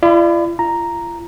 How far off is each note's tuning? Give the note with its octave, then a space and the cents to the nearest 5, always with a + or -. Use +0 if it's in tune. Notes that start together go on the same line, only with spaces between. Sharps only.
F4 -45 D5 +25 B5 +30
F4 -40 A#5 +0